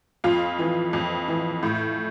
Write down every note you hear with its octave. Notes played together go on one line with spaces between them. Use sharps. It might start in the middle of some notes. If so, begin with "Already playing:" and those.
F2 F4
E3
F2
E3
A2